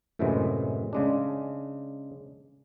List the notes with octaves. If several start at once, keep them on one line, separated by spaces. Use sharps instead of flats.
F#2 A2 C3 E3 F#3 G#3
C#3 G#3 D4